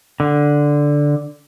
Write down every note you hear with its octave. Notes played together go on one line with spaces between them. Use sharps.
D3